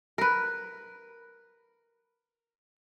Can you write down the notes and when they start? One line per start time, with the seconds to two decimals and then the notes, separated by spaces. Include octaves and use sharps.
0.18 A#4 B4